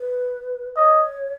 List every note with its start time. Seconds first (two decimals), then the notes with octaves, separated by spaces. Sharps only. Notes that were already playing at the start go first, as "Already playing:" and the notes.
Already playing: B4
0.76 C#5 D#5